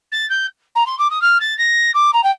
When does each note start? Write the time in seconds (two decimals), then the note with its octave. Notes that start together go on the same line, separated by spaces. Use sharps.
0.12 A6
0.29 G6
0.75 A#5
0.86 C6
0.98 D6
1.10 D#6
1.21 F6
1.40 A6
1.58 A#6
1.94 D6
2.13 A#5
2.23 G5